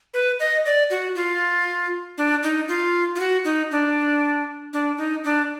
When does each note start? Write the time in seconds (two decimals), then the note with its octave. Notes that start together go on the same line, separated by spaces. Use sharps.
0.14 B4
0.40 D#5
0.65 D5
0.90 F#4
1.15 F4
2.18 D4
2.43 D#4
2.68 F4
3.15 F4
3.19 F#4
3.44 D#4
3.71 D4
4.73 D4
4.97 D#4
5.24 D4